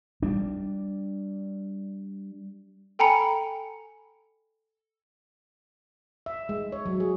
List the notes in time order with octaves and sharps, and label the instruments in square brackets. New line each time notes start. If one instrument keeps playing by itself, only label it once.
[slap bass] G3 D4
[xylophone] A4 G5 G#5 A#5 B5 C#7
[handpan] E5
G#3
C#5
F#3
G#4